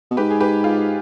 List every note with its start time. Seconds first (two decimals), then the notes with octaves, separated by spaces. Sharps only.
0.11 B2
0.17 G#2 G4 B4
0.30 G#4
0.40 G4 B4
0.64 F4 G#4